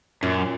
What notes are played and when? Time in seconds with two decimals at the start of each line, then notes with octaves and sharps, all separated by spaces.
0.23 F#2 A#2